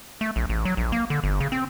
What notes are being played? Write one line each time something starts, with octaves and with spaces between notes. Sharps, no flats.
A3
A#1
A1
F#3
A#1
A#3
D3
G1
C#3
C4